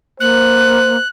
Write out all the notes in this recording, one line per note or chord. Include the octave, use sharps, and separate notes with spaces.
A#3 C5 F#6